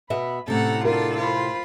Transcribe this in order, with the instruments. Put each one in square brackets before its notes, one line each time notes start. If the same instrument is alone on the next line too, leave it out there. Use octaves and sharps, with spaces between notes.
[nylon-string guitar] B2 B3 E5 [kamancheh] B5
[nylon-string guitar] A2 C3 [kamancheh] C#4 A#5 [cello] A4 F#5
[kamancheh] D4 F#4 [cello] F4 A4 [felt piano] A#4
[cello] F4 [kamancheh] C5 B5